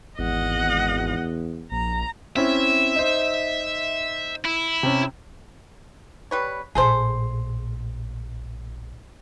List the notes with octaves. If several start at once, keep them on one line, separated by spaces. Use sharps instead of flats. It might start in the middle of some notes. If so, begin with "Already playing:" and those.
G#1 E2 D#5 F#5
A#1 A#5
C4 C#4 E4 E5
D#4 C5
E4
C3 C#4
G3 B4 C#5
A#1 A2 G#4 A4 C5